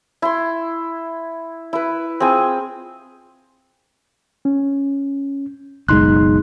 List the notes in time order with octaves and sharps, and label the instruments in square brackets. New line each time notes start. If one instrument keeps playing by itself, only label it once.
[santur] E4 C6
E4 B4
C4 F4 G#4 G#5
[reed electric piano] C#4
[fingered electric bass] F#1 B1 G#3 [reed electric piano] D#4 C6 F#6